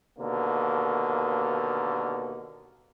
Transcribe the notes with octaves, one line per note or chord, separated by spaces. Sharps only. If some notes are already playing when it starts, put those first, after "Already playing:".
D#2 B2 D3 A#3